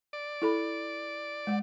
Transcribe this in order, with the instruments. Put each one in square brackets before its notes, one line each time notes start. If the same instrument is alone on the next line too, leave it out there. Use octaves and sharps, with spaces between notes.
[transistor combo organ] D5
[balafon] E4 A4 B5
G#3 F#5